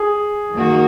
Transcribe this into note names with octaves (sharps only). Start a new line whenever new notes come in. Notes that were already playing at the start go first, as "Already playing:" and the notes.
Already playing: G#4
D#3 A#3 D#4 F#4